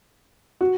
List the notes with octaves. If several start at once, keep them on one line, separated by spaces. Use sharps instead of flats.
F#4